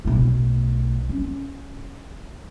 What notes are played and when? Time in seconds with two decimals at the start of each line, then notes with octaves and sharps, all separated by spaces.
0.05 B1 A3
1.09 C#4